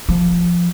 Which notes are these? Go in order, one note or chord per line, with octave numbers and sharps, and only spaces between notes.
F3